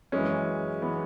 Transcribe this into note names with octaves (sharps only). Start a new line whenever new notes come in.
F#2 E3 G#3 C#4
E3 B3